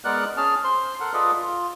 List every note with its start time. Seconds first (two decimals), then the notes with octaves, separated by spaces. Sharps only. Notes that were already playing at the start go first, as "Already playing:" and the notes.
0.05 G#3 B3 A#4 D5 F#5 F#6
0.37 C#4 G#4 A5 F6
0.64 C5 C6
1.00 A4 A#4 F#5
1.13 F4 G#4 A4 B4 D5 D#5
1.38 F4